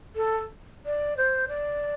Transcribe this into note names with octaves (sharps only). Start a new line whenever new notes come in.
A4
D5
C5
D5